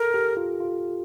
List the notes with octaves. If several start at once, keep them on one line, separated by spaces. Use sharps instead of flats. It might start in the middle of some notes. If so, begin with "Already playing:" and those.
Already playing: A4 A#4
G4
F4
F4